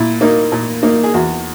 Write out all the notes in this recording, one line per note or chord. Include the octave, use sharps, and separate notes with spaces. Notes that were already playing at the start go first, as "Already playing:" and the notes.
Already playing: A#2 E4
A#3 D#4
A#2
A#3 D#4
G#4
E2 F#4